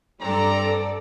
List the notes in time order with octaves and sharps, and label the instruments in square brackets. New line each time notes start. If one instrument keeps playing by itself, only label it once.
[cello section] G2 A4 D5 [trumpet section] C4 D4 A#5